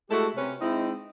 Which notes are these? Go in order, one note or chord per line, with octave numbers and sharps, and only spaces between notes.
G#3 A3 E4 F#4 G4 A4
C3 C#4 B4
G#3 C4 D#4 E4